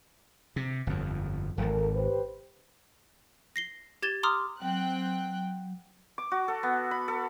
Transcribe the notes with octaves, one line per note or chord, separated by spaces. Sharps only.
C3
G1 F2
D#1 G#1 A4 A#4
G4 B4 C5
A#6 C7 G7
G4 G#6 A6 E7 G7
A#5 C6 D6 D#6 F6
F#3 C4 G5 F#6
D6
F#4
A4
B3
B5
A4